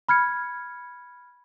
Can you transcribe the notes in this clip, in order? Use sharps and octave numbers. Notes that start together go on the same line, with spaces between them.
B5 F6 G#6 C#7